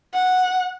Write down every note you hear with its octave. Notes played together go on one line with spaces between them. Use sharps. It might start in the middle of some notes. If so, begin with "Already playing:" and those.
F#5